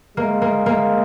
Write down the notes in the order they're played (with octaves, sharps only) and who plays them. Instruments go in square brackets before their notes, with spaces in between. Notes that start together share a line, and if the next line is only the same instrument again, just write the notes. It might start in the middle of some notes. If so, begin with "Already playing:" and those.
[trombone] G#3 [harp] A#3
[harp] A#3
A#3